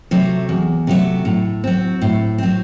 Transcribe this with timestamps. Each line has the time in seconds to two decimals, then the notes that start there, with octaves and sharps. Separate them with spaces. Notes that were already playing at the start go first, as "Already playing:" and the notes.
0.11 C3 F#3 A3
0.49 E2
0.87 C3 F#3 A3
1.25 A2
1.64 F#3 C4
2.02 A2
2.38 F#3 C4